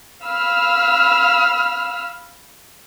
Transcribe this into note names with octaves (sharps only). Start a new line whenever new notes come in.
F5 B5 E6 F6